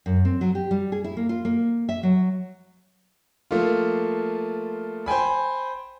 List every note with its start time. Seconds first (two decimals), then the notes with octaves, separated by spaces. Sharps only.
0.06 F#2
0.25 C4
0.41 F#3
0.55 G4
0.71 G3
0.92 G#4
1.04 E4
1.17 A#3
1.29 F4
1.45 A#3
1.89 E5
2.03 F#3
3.51 F3 A3 A#3 F4
5.06 C5 G5 G#5 B5